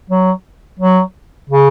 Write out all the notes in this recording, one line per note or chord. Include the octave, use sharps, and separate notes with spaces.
F#3
F#3
C#3